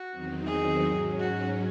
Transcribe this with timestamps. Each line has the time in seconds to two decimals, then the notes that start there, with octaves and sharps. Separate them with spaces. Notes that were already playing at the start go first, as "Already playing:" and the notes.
Already playing: F#4
0.10 E2 D#3 F#3 C4 D#4
0.46 G#4
0.83 G#2 F#3 C#4
1.19 F#4